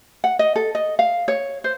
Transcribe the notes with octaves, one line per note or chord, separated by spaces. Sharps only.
F#5
D#5
A4
D#5
F5
C#5
C5